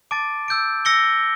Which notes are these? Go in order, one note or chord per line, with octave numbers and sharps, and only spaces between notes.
A5 D6 A6 D7
E6 G6 D7
E6 A#6 C#7 G7